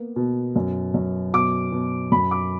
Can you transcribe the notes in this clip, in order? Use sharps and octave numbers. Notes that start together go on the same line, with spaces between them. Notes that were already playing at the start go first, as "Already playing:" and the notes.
Already playing: A#3 B3
B2
F#2
F#2
B2 D6
B2
F#2 B5
D6